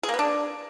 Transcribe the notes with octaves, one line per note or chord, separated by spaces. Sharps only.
G#4
A#3
B3
D4